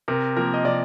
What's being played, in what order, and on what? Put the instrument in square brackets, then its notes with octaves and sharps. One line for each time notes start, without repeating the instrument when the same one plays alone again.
[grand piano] C3 A#4
F3 A#3 A#4
D#5
C3 D5